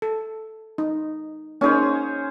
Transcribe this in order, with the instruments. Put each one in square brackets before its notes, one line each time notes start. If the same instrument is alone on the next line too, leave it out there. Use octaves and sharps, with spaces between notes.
[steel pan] A4
D#4
[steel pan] A#3 D#4 [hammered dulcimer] C#4 G#4 C5